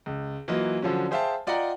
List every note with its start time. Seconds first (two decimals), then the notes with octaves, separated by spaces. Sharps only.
0.06 C#2
0.48 E3 F#3 A#3 F4 D#5
0.82 D3 F3 F#3 C#4
1.11 G#4 C5 E5 F5 G5 A5
1.47 F4 D5 D#5 F#5 G5 A#5